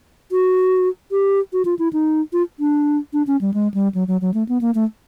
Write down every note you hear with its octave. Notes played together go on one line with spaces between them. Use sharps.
F#4
G4
F#4
F4
E4
D#4
F4
D4
D4
C#4
G3
G#3
G3
F#3
F#3
F#3
A3
B3
A#3
A3